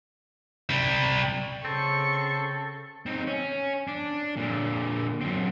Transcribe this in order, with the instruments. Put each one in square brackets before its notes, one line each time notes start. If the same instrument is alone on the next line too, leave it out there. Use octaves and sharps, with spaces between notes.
[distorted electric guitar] C3 G3
[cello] C#3 [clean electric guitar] C4 [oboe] A4 [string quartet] C#6
[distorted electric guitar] C4 D#4
C#4
D4
A#2 D3
F#2 C4